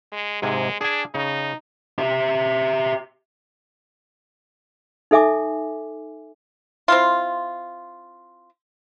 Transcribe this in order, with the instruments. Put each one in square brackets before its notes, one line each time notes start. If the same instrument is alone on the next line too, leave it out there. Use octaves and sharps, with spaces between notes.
[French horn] G#3
[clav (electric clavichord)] G#2 C3 G#5 [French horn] G#3
[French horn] D4 [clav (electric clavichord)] G#4 G#5
[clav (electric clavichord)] C#3 [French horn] D#4
[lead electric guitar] G4 E5
[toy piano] D#4 A4 E5 G#5 D6
[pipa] C4 E4 F4